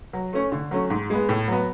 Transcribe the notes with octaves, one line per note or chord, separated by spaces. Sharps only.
F#3
A3 C#4
D3
F#3 A3 C#4
G#2
G#3 B3
A2
F#3 B3